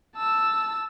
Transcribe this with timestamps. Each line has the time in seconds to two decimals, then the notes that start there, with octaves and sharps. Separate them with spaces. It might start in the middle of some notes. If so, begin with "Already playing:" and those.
0.16 A5 E6